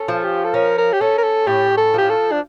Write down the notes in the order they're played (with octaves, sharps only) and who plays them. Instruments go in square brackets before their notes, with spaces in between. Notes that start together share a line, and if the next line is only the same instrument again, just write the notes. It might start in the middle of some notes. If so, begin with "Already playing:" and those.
Already playing: [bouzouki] C#4 [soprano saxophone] A4
[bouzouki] F3
[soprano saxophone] G4
A4
[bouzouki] C#4 [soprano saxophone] A#4
[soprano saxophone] A#4
G4
[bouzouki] C#4 [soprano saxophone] A4
[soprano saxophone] A#4
A4
[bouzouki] A2 [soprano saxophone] G4
[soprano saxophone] A4
[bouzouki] F3 [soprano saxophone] G4
[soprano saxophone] A4
D4